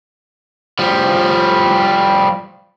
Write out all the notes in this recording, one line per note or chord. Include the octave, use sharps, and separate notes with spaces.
F3 G3